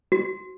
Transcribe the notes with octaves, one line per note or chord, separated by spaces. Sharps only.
F#4